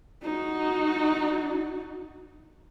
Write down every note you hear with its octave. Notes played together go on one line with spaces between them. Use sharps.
D#4 F#4